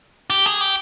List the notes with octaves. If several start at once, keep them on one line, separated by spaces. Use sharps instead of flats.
G4
G#4
G4